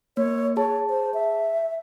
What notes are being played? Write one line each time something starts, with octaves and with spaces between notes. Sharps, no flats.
A#3 C#5
G#4 C#5 A5
C5
E5